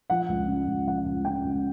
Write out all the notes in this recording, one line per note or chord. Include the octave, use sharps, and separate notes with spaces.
F3 F#5
C#2
C#3
C#2
F3 F#5
C#2
C#3 G5
C#2